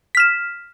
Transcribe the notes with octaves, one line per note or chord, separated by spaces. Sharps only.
F6 B6 E7